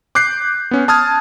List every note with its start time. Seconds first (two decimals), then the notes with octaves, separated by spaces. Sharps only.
0.15 D6 F#6 G6 C7
0.71 B3 C#4
0.88 A5 D#6 F6 G#6